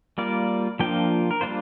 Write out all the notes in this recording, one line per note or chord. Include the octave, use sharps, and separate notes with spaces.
G3 A#3 F4 D5
F3 A#3 D4 F4 G5
A#4
G3 A#3 D4 F4 C5